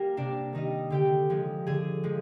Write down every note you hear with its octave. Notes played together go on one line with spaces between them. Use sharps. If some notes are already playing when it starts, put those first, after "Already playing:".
Already playing: G3 A#3 A#4
C3 D4 D5
D#3 G3 D#4 D#5
D3 G4 G5
F3 G#3
D3 G#4 G#5
F3 G#3